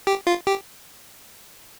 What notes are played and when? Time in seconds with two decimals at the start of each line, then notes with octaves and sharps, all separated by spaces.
0.07 G4
0.27 F4
0.47 G4